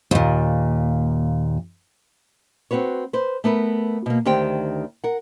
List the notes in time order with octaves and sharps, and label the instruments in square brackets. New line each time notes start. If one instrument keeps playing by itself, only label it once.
[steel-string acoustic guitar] D#2 A#2
[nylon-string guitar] C4 C#4 F#4 B4 C#5
B4 C5
A3 B3 A#4 B4
B2 A#3
D2 D#3 G4 C5 G5
A#4 F#5